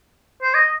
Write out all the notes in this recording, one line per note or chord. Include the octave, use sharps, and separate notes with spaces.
C5
D#5